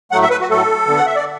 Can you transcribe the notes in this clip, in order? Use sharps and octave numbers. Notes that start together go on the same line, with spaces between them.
A2 F#3 A3 F#5
E5
B4
F#4
A2 F#3 A3 A4
D3 B3
F#5
E5
D5